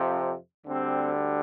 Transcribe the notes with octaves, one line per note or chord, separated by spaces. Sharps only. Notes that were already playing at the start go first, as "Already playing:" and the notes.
Already playing: F2 C3 F3
D2 D3 G3 C4